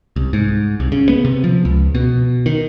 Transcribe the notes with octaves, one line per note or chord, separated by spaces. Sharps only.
C2
G#2
C2
C#3
B3
C3
F3
C#2
B2
D#3